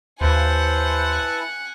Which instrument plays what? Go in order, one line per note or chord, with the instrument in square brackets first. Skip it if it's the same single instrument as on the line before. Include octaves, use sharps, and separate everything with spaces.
[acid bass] D#2 [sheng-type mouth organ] E4 B4 A5 [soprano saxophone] C5 [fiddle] F#5 G#5